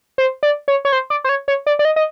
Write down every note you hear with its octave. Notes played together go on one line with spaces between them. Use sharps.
C5
D5
C#5
C#5
C5
D5
C5
C#5
C#5
D5
D5
D#5
D#5